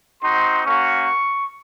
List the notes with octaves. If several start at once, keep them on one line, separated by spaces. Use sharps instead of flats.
C4 D#4 F#4 C6
A#3 C#4 F#4 C#6